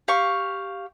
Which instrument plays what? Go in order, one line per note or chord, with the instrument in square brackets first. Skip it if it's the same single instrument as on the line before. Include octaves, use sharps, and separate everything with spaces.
[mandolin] G4 F5 C#6